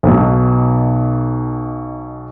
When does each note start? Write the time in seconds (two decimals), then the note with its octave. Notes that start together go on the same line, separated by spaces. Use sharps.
0.03 B1 B2